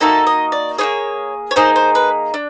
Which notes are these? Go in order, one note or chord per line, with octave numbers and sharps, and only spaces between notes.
A#3 D#4 F#4 A4 E5
D#5
D5
A#3 D#4 G#4 C#5
C#5
A#3 D#4 G#4 C5
C5
B4
D4